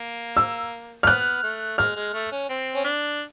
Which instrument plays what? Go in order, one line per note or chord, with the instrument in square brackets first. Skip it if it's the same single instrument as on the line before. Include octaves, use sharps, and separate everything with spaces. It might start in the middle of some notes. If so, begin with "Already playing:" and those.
Already playing: [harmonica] A#3
[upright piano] E6
F6
[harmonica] B3 [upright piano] F#6
[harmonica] A3
[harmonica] G#3 [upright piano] F6
[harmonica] G#3
A3
C#4
C4
C#4
D4